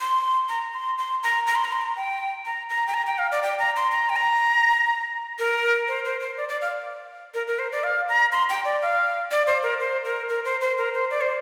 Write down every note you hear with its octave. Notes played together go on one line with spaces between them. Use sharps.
C6
A#5
C6
C6
A#5
A#5
C6
A#5
C6
A#5
G5
A#5
A#5
G5
A#5
G5
F5
D5
G5
A#5
C6
A#5
G5
A#5
A#4
C5
C5
C5
D5
D5
F5
A#4
A#4
C5
D5
F5
A#5
C6
G5
D5
F5
D5
C5
A#4
C5
A#4
A#4
C5
C5
A#4
C5
D5
C5